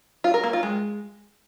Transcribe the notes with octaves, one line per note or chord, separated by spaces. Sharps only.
F4
A#4
A#3
F4
G#3